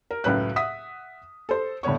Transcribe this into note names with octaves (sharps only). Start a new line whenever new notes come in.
A#4
C#2 F#2 A2 B4 F#6
E5 F#5 D#6 B6
A4 C5
A2 D3 B3 C#5 C#6